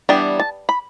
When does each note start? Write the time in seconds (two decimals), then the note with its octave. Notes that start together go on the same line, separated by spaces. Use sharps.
0.09 E3 G3 B3 D4 G5
0.40 A5
0.69 B5